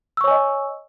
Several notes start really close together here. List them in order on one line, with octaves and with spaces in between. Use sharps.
E6 C#6 C#5 G#5 D#5